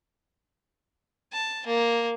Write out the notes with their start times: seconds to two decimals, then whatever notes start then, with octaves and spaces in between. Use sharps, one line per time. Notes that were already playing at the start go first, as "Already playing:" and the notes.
1.33 A5
1.67 A#3